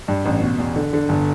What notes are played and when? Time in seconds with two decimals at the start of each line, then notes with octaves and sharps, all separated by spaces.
0.08 G2
0.25 A1
0.42 B2
0.58 E2
0.76 D3
0.93 D3
1.09 G1